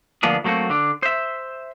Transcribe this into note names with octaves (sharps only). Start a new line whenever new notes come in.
D2 F3 A#3 B3 D4 G#4
F#3 A3 A#3 C4 F#4
D3 D4
C5 E5